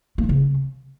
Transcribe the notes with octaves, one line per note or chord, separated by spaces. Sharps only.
A#3
E4
C#3